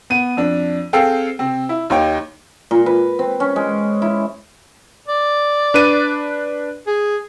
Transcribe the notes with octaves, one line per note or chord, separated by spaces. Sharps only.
B3 D#7
F2 D4
C4 G#4 A4 F5 G5
C3 C4
E4
D#2 D#4 C#5 G5
A#2
B4
C4
C#4
G#3
E4
D5
D4 B4 D#7
G#4